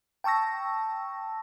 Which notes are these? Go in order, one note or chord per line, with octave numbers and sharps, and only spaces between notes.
G5 A5 C#6 E6 A#6